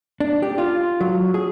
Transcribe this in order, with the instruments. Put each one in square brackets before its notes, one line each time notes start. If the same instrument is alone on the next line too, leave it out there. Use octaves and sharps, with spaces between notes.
[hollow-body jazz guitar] D4
G4
F4
F#3
G#4